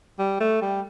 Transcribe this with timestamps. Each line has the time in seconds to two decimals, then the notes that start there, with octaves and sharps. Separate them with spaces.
0.19 G3
0.40 A3
0.62 G3